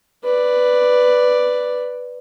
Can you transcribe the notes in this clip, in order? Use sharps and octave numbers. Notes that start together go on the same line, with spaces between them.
B4 D5